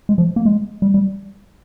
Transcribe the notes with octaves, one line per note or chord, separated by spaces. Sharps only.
G#3
F3
A#3
G#3
G3
G3